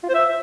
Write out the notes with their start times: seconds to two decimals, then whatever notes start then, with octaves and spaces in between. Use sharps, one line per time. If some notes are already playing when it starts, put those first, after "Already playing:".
0.03 F4
0.09 C5
0.14 E5